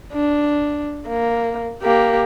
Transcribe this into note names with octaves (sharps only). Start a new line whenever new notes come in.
D4
A#3
A#3 G4